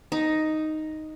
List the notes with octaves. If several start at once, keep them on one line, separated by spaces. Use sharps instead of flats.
D#4